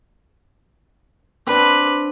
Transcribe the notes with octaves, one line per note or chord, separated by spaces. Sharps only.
C4 D4 B4